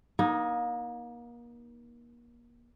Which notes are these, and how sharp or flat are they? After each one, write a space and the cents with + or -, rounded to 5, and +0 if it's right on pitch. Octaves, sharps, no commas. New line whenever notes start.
A#3 +35 D#4 +0